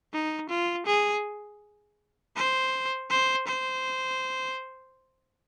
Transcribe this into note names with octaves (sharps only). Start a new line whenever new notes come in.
D#4
F4
G#4
C5
C5
C5